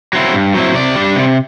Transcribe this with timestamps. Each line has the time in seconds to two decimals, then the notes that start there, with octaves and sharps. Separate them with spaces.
0.13 F#3 C4 E4
0.33 G2
0.54 F#3 C4 E4
0.74 C3 D5
0.95 G3 D4
1.16 C3